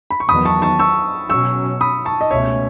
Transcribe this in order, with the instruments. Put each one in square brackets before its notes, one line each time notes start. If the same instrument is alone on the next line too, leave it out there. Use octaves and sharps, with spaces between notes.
[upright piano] B5
C#6
[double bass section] E2 D#3 F#3 B3 [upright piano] B5 D#6
[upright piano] A5 C#6
A5 C#6
C#6 E6
[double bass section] B2 F#3 C#4 [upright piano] C#6 E6
[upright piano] B5 D#6
A5 C#6
D#5
[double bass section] C#2 B2 A3 C#4 [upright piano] C#5 E5